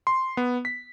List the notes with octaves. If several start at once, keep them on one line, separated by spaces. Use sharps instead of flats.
C6
B3
B6